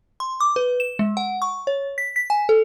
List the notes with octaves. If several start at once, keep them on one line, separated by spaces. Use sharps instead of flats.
C6
D6
B4
E7
G#3
F#5
C#6
C#5
B6
B6
G#5
A4